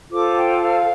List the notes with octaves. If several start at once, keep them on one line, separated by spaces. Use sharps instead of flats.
F4 A4 C5 D6
A5
G5
F5